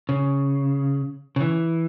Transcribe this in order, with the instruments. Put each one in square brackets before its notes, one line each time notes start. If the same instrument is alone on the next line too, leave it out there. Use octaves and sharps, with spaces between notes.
[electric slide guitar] C#3
C#3
E3